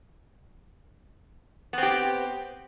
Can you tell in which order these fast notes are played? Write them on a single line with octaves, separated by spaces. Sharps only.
B3 C4 G4